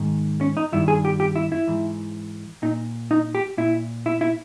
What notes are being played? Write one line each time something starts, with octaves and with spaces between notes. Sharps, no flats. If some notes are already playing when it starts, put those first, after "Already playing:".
Already playing: G#2 D#3
C#4
D#4
G2 D#3 E4
G#4
G4
G4
E4
E4
G#2 E3
A#2 D#4
D#4
G4
A#2 E4
E4
E4